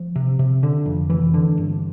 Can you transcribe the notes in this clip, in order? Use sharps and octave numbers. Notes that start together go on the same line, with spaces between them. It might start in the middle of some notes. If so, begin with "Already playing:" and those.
Already playing: F3
C3
C3
D3
F2
F1 E3
D3
G1